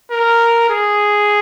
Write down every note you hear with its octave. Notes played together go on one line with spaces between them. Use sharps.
A#4
G#4